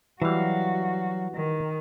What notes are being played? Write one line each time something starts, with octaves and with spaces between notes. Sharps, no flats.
E3 F#3 G3 F#4 F5
D#3